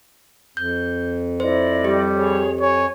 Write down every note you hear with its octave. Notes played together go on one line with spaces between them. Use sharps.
F2 G6
E4 C5 D5 D#5
G3 G4
G#4 C#5
C#5 G#5